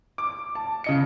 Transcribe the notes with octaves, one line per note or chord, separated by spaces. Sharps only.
D6
A5
C#3 D#5 C#7